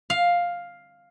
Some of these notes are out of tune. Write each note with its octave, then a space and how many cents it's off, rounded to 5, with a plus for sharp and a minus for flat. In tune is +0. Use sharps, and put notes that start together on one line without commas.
F5 +5